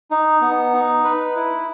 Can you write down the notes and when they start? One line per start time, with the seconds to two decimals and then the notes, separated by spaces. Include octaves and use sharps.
0.11 D#4
0.41 B3
0.73 D#4
1.04 B4
1.36 E4